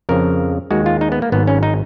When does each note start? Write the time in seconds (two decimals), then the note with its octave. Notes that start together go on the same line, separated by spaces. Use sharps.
0.09 F2 C#3 F3 A#4
0.71 D#2 D#3 G#3 F#4
0.86 F4
1.01 D#4
1.12 B3
1.22 A#3
1.32 G#1 G#2 F#3 B3
1.47 C#4
1.63 D#4